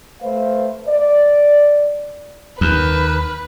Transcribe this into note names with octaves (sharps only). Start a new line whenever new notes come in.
A3 B4 C5 E5 F5
D5
D#2 B4